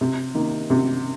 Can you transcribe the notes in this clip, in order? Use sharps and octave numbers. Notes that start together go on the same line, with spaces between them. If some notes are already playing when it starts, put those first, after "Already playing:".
C3
D#3 A#3
C3